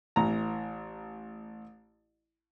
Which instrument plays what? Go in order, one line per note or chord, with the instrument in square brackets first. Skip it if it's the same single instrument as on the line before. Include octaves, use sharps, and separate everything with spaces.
[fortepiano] A1 E3 A#5